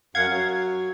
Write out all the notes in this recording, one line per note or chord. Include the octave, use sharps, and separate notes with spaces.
F#2 F5 F#5 G#6
F#3